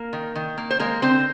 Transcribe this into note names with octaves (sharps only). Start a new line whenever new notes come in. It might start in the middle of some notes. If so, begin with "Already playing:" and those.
Already playing: A#3 A#4
D#3
D#3
A#3
C5
G#3 A#3 A#4
D3 C4 C5